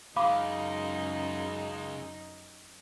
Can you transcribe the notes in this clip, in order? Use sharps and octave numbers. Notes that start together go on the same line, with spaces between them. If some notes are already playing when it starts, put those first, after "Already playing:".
F#2 C#3 G#3 D#4 F5 B5 D6